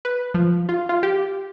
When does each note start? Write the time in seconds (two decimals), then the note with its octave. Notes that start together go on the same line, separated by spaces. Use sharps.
0.05 B4
0.34 F3
0.69 F4
0.89 F4
1.03 G4